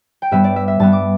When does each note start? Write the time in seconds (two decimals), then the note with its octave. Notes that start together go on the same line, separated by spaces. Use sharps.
0.22 G5
0.31 G2 G3 B3 E5
0.44 D5
0.56 E5
0.68 E5
0.80 G2 G3 B3 A5
0.93 D6